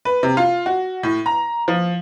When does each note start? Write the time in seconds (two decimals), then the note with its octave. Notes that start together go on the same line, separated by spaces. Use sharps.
0.05 B4
0.23 C3
0.37 F4
0.66 F#4
1.03 A2
1.26 A#5
1.68 F3